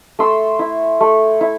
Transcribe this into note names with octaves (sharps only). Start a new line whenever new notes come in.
A3 C6 E6
E4
A3
E4